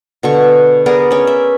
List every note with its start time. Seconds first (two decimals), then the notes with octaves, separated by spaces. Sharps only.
0.23 B2 D3 C#6
0.86 B3 G#4 A#4 D5
1.11 C#4 D5
1.27 E5